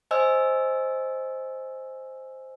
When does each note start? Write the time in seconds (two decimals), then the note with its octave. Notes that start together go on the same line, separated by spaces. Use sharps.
0.11 C5 D#5 G#5 E6